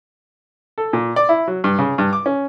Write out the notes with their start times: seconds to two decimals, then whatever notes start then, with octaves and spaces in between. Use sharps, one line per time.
0.78 A4
0.93 A#2
1.16 D5
1.29 E4
1.48 F#3
1.64 G2
1.79 C#3
1.98 G2
2.13 D6
2.26 C#4